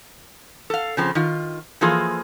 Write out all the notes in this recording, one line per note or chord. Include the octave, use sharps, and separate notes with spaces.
A4 F5
C#3 F3 C4
D#3 F4
E3 F3 A#3 F4 G#4 A4